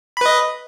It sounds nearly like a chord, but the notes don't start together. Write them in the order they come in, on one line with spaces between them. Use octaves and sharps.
B5 B4 D#5